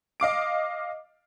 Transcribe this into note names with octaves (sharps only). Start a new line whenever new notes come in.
D#5 F5 D6 D7